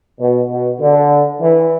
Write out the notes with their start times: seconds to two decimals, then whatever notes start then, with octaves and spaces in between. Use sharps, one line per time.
0.20 B2
0.50 B2
0.81 D3
1.41 E3